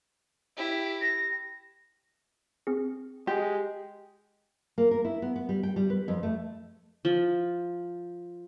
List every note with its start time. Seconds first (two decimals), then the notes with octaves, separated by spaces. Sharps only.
0.57 E4 G4
1.02 A#6
2.67 C4 G#4
3.27 G#3 G4
4.78 A#3
4.91 A#4
5.05 E4
5.22 B3
5.36 B3
5.49 G3
5.63 G5
5.76 G3
5.90 B4
6.08 F2
6.23 A3
7.05 F3